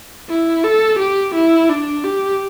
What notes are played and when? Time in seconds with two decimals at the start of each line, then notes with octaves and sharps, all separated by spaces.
0.29 E4
0.64 A4
0.99 G4
1.35 E4
1.69 D4
2.04 G4